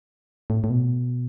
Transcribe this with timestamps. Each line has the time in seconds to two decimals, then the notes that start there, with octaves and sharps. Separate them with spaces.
0.50 A2
0.64 A2
0.70 B2